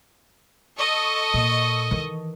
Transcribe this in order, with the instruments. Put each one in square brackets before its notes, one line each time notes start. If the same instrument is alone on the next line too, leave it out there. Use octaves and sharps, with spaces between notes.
[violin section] A4 D#5 C#6
[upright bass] A#2
D#3 E3